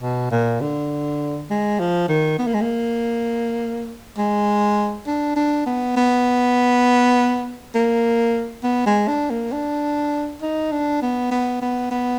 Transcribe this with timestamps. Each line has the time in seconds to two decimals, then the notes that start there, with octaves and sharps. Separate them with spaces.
0.01 B2
0.31 A#2
0.61 D3
1.50 G#3
1.80 F3
2.09 D#3
2.38 B3
2.47 A#3
2.54 G#3
2.61 A#3
4.18 G#3
5.07 D4
5.36 D4
5.66 B3
5.96 B3
7.75 A#3
8.63 B3
8.86 G#3
9.08 D4
9.30 A#3
9.52 D4
10.42 D#4
10.71 D4
11.02 B3
11.31 B3
11.62 B3
11.91 B3